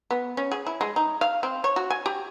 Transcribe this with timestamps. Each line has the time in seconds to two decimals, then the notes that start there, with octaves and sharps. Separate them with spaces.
0.11 B3
0.37 C#4
0.52 G#4
0.67 E4
0.81 G#3
0.96 D#4
1.21 F5
1.43 C4
1.64 C#5
1.76 F#4
1.90 G#5
2.06 G4